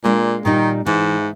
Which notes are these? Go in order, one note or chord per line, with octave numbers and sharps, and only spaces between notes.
A#2 G#3 A#3 D4
A#2 D#3 G3 D#4
G#2 E3